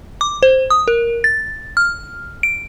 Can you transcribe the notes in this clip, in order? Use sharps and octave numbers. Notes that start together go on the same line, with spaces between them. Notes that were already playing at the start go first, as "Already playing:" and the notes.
D6
C5
D#6
A#4
A6
F6
D7